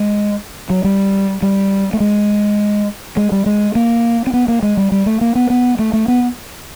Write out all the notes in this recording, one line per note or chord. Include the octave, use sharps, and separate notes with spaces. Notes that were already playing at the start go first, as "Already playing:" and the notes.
Already playing: G#3
F#3
G3
G3
A3
G#3
G#3
G3
G#3
A#3
C4
B3
A#3
G#3
G3
G3
A3
A#3
B3
B3
A3
A3
B3